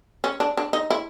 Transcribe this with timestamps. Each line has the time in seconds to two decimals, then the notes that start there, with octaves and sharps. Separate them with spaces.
0.24 C#4
0.40 D4
0.57 D4
0.73 D#4
0.90 E4